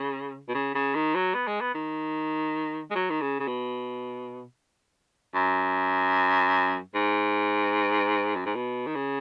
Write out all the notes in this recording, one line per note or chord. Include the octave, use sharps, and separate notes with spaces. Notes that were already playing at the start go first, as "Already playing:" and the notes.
Already playing: C#3
B2
C#3
C#3
D#3
F#3
B3
G#3
B3
D#3
G#3
F#3
D#3
C#3
C#3
B2
F#2
G#2
F#2
G#2
B2
D#3
C#3